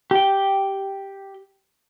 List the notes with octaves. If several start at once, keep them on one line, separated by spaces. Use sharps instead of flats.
G4 G5